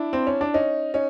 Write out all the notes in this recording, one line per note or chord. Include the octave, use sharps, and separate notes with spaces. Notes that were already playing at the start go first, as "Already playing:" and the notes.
Already playing: D4 E4
C4
C#4
D4
C#4 D#4
C#4 D#4